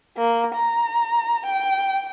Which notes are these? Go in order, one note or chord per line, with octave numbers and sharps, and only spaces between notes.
A#3
A#5
G5